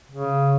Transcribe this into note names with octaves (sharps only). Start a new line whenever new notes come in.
C#3